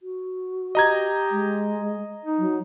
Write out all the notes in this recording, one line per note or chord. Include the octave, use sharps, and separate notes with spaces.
F#4
G4 D#5 A#5 G#6
G#3
D#4
F#3